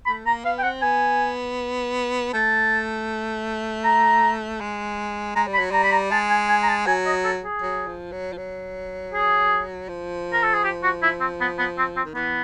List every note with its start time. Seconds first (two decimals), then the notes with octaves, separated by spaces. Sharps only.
0.06 A3 B5
0.26 A#3 A#5
0.45 B3 F5
0.58 G5
0.63 C4 F#5
0.82 B3 G#5
2.33 A3 A5
3.84 A#5
4.60 G#3
5.36 G#3 A#5
5.47 G3
5.54 B5
5.59 F#3
5.71 G3 A#5
5.84 B5
5.92 A#5
6.11 G#3 A5
6.30 G#5
6.49 G#5
6.63 A#5
6.68 A5
6.86 F#3 G#5
7.06 D#5
7.24 A4
7.44 G#4
7.62 F#3
7.87 F3
8.12 F#3
8.32 F3
8.37 F#3
9.14 G#4
9.89 F3
10.33 A#4
10.43 A4
10.54 G#4
10.64 G4
10.83 F#4
11.03 E4
11.20 C4
11.40 B3
11.58 B3
11.78 C4
11.96 C4
12.05 D#3
12.15 E3 B3